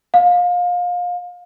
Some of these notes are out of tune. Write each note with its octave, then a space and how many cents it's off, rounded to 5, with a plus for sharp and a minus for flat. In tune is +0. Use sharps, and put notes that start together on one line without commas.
F5 +25